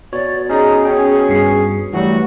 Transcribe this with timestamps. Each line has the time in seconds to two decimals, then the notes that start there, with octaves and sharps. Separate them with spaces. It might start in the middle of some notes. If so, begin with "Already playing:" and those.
0.13 B2 C#5 D5
0.49 C#4 D#4 G#4
0.85 C#4 G5
1.29 G2 C7
1.93 E3 F#3 G3 A3 F#4